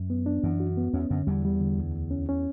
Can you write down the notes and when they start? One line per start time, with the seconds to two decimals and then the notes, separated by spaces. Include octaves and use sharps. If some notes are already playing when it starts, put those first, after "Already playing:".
Already playing: F#2
0.10 B3
0.26 D4
0.43 F#2 E3
0.60 F#4
0.77 B3
0.93 E2 C#4
1.10 F#2 D3
1.27 E2 G3
1.45 G3
1.61 D3
1.78 D2
1.94 D2
2.11 C#4
2.29 C#4